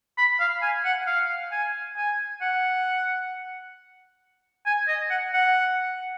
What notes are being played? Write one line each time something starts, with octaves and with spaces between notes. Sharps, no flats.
B5
F5
G#5
F#5
F5
G#5
G#5
F#5
G#5
D#5
F#5
F#5